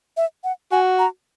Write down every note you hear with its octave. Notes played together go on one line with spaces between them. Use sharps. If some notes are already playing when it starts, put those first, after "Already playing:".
E5
F#5
F#4 G#5
A#5